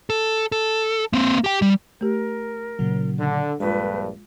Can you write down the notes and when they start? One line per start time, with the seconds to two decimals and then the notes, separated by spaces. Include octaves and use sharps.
0.10 A4
0.52 A4
1.13 A#3 C4
1.44 G4 G5
1.62 G3
2.01 A3 G4 A#4
2.79 A#2 C#3 F#3
3.19 D3
3.60 A#1 G2 G#3 F4 A4 B4